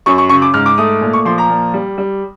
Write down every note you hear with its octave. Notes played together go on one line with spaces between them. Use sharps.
F#2 C#6
C#6
C#3 C#6
D6
G#2 F6
D6
A3 D#6
A#2
C#6
F3 C6
A#5
A#2
G3
G3